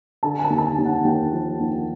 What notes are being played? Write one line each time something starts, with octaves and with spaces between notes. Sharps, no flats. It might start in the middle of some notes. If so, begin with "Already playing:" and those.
D3 A5
G#5
A5
D#2
A5
G#5
D#2
F#5
D#2 G5
F3
D#2